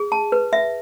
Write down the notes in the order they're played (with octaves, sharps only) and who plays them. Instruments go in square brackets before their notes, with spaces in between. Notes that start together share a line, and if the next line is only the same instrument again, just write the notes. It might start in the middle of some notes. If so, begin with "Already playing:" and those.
Already playing: [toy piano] G#4
A5
B4
E5